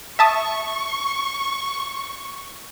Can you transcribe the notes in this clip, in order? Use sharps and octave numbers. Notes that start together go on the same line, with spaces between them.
E5 A5 C#6 D#6